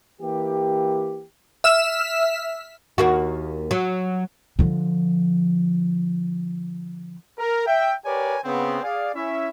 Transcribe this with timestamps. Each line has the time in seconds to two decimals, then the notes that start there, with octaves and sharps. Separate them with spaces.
0.21 E3 A#3 G4
1.64 E5 E6 F6 E7
2.98 D#2 A#3 F#4
3.71 F#3
4.59 D3 F3
7.39 A#4
7.67 E5 G5
8.05 G4 A#4 B4 C#5 D5 G#5
8.45 C#3 B3 C4
8.82 G#4 D5 F5
9.14 C#4 E4 E5